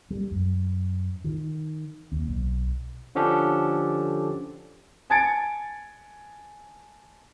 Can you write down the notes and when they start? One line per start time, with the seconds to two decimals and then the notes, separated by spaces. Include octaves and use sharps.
0.10 G3
0.31 F#2
1.24 D#3
2.12 D#2
2.28 B1
3.15 D3 F3 C#4 D4 G4 A4
5.10 G#5 A5 G#6 A6 C#7 D7